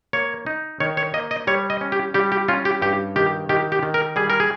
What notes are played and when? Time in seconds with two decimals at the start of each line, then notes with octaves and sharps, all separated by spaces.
0.13 A#3 C#5
0.46 D#4
0.80 D#3 C#5
0.97 C#5
1.14 A#3 D#5
1.31 D#5
1.47 G3 C#5
1.70 D#5
1.81 C#4
1.92 G4
2.14 G3 G4
2.32 G4
2.48 C#4 F4
2.65 G4
2.82 G2 G4
3.16 D#3 G4
3.49 D#3 G4
3.72 G4
3.83 D#3
3.94 A#4
4.16 G3 G#4
4.30 A#4
4.40 G#4